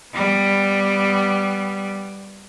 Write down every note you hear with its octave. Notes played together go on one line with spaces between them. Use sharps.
G3 B3